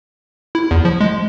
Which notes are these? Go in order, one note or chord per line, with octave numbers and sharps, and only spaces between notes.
E4
E2
F3
G#3